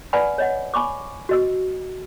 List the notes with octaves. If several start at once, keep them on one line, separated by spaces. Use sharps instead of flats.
B4 D5 F#5 G#5 B5
C#5 D#5 F#5
G#5 B5 C#6 D6
F#4 D#5 E6